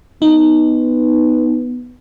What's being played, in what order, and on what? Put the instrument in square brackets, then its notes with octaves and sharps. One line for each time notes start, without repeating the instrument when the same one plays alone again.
[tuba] B3 [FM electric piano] D#4